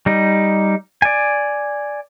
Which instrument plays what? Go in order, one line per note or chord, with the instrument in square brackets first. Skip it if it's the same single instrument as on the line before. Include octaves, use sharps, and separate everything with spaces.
[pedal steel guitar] G3 D#4
D5 G#5